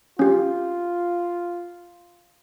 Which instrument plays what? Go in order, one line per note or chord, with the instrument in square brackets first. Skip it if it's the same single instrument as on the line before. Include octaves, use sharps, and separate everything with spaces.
[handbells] C#4 G4 [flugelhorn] F4